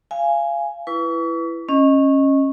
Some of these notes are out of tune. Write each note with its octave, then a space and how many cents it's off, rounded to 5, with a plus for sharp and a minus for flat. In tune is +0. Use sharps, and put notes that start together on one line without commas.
F5 -30 G#5 +0
E4 +20 B4 +0 C#6 +40
C#4 -20 D#5 +0